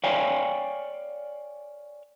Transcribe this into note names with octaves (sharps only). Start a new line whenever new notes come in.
C#5 D5 F5 G5 G#5